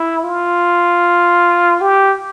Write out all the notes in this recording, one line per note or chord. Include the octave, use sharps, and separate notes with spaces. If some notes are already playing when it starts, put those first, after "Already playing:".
Already playing: E4
F4
G4